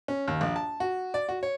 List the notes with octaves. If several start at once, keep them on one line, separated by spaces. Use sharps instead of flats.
C#4
D#2
A#1
A5
F#4
D5
F#4
C#5